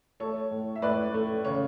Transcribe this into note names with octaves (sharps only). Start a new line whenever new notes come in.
A3 A4 C#5
A2
E5
A2 B4 D5
A3
C#3 C#5